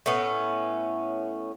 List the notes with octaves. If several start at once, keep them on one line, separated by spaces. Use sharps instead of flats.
A2 B3 C#4